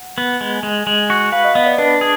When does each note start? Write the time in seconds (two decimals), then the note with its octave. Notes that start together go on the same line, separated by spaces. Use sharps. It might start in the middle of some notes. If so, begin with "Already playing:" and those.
Already playing: F#5
0.18 B3
0.41 G#3
0.63 G#3
0.87 G#3
1.10 F#4
1.32 B4 F5
1.44 D#5
1.55 B3 D#5
1.66 D5
1.78 D4 B4
2.01 G#4